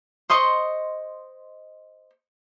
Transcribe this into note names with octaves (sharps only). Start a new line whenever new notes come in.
C5 D#5 C6 C#6